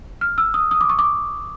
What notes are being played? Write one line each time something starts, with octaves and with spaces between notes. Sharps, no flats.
F6
E6
D#6
D#6
D6
C#6
D6